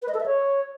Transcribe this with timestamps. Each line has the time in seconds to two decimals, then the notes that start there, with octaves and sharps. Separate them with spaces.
0.02 B4
0.08 D#5
0.14 A4
0.20 E5
0.26 C#5